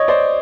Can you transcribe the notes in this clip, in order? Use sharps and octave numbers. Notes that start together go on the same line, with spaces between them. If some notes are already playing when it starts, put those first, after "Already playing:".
Already playing: C#5 D#5
C5 D5